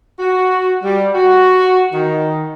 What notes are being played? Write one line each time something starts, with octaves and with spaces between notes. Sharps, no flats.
F#4
G3
F#4
D#3